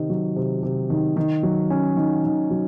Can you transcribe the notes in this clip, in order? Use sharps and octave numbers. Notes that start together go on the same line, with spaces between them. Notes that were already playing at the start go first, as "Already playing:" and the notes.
Already playing: C3 D#3
F#3
C3
C3
D#3
D#3
F#3
C#4
D#3
D#3
F#3